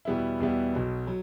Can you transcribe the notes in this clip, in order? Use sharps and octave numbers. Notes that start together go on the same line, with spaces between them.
E2 B2 G3 B3 E4
E2 B2 G3 B3 E4
B1 B2 F#3
F#3